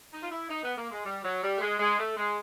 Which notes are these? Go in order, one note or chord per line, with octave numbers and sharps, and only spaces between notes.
D#4
F4
E4
D#4
B3
A#3
G#3
G3
F#3
G3
A3
G#3
G#3
A3
G#3